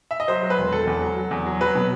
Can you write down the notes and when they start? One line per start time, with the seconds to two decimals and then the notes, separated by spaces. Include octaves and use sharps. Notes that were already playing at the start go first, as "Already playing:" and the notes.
0.11 E5
0.20 D#5
0.28 F#3 C5
0.43 F#3
0.50 B4
0.58 E1
0.72 E1 A4
0.87 E2
1.02 F#3
1.16 F#3
1.31 E2
1.46 F#3
1.61 F#3 B4
1.75 B2